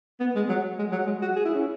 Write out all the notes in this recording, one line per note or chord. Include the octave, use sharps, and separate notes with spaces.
B3
G#3
F#3
G#3
F#3
G#3
F#4
G#4
E4
C#4